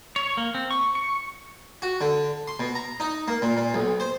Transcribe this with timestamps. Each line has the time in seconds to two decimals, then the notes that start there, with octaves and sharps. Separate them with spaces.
0.16 C#5
0.37 A#3
0.55 C4
0.71 C#6
0.95 C#6
1.82 F#4
2.01 D3
2.48 C6
2.59 B2
2.75 A#5
3.00 D#4
3.28 A#3
3.42 A#2
3.57 A#2
3.74 B1
4.00 C5